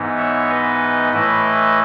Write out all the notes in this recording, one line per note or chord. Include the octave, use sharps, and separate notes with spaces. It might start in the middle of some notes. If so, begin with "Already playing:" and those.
Already playing: G#2 E3 B3 D#4
C#5 E5
B4 D#5
A2 E3 A3 E4 B4 D#5